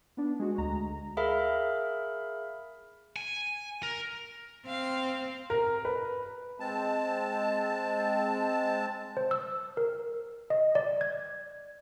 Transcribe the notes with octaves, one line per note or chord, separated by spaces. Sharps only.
B3 D4
G#3 F#4
D2 A#5
G#4 A#4 E5 F5 B5
G#5
A#4
C4 F5
A#4
B4
G#3 C4 A5
C5
E6
A#4
D#5
D5
G#6